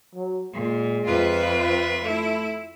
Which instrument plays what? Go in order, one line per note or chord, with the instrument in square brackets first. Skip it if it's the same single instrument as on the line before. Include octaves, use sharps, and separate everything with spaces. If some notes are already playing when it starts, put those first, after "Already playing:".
[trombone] F#3
[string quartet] A#2 [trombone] G#3
[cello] F2 B4 [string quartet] F4 E5
[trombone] A3 [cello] E4